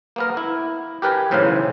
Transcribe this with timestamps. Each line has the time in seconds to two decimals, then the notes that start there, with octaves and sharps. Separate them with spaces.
0.16 A#3 B3 A#4
0.37 E4
1.02 G4 A#4 B4 G5 G#5
1.31 B1 A2 C#3 E3 C5 F5